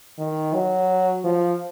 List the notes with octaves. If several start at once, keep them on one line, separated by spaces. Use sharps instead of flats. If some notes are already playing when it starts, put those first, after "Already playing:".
D#3
F#3
F3